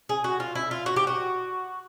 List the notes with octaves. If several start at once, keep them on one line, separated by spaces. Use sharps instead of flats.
G#4
F#4
F4
E4
F4
F#4
G4
F#4